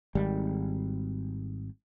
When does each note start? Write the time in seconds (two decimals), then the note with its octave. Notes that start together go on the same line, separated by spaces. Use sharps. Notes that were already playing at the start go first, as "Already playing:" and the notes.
0.15 G#1 G3